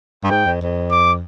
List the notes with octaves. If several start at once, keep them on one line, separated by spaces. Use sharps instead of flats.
G2
G#2 G5
F2
F2
D6